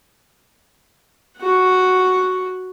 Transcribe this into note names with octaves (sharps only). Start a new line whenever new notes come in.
F#4 F#5